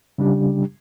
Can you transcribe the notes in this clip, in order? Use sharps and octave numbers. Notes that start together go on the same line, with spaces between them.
C#3 G3 D4 G4